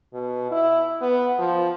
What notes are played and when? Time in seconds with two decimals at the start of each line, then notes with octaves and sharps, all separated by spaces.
0.13 B2
0.51 E4
1.01 B3
1.38 F3